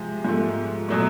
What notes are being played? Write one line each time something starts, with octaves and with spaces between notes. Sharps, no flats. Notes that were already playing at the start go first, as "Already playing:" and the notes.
Already playing: C3 F3 G#3
G#2 F3 A3
B2 F#3 A3